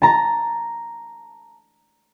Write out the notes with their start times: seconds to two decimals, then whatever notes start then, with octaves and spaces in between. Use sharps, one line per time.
0.02 A5 A#5